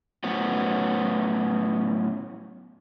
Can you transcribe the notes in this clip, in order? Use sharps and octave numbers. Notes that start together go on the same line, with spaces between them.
A2 F#3 B3 C#4 F#4